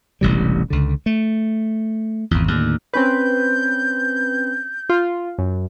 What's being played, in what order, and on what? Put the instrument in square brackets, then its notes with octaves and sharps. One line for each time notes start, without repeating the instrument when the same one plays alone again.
[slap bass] E1 A1 C3 G3
C#2 D3
A3
G#1 E2
D#2 A2 D3
[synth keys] C4 C#4 B4 [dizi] G6
[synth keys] F4
F#2